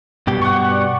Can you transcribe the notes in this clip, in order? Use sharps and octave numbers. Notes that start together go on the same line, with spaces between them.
G2 B2 G4
F#5 C#6
D5